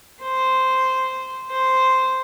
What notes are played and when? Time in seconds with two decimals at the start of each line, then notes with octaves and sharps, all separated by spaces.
0.22 C5
1.51 C5